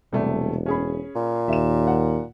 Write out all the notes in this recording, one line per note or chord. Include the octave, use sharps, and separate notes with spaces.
E1 C3 G3 A3
C#4 G#4 B5
A#2
D#2 E5 E7
F#5